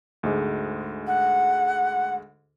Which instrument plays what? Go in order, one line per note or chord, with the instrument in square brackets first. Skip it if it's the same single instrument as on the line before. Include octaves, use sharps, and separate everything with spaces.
[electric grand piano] D2 G#2 G#3
[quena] F#5